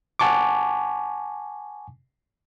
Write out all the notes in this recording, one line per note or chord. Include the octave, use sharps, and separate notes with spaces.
F#5 G#5 A5 C#6 D6